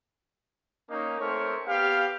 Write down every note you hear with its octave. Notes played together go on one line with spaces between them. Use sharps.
A#3 C#4 D#4
A3 C4 A#4 C#5
B3 G4 F5